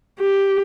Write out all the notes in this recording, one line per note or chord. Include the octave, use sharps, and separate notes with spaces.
G4